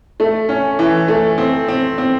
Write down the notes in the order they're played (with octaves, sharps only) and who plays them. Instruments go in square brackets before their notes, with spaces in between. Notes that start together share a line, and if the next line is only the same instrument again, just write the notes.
[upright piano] A3
C#4
E3
A3
C4
C4
C4